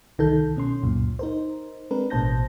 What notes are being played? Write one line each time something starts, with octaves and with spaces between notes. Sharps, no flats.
C2 D#3 A4 G6
B2 C#4 C6
C#2 F#2 A#2
D#4 A#4 C5
G#3 C4 D4 A#4 B4
A1 B2 C5 A5 G6 A#6